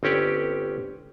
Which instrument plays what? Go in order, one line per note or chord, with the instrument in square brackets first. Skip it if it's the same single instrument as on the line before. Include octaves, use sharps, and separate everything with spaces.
[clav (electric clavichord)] G1 C4 C#4 G4 D5